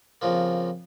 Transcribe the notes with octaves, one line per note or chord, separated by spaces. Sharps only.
F2 C#3 F3 A#3